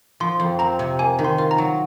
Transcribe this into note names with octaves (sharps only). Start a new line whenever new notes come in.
F3 C6
F2
C4 A#5
C3
A#3 G#5
D#3
C6
F4
A#5
F#3